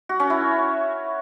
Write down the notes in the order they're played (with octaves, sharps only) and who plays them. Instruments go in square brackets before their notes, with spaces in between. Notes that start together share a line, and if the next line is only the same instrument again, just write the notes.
[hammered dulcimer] F#4
C#4
E4